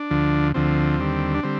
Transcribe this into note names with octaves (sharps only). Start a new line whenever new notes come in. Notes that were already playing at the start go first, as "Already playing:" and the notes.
Already playing: D4
D2 D3 F3
D2 D3 F3 C4
D#2 D3 G3
D4
D3 G3 C4